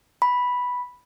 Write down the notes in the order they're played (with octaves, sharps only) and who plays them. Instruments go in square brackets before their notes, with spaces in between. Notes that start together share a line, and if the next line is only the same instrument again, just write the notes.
[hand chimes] B5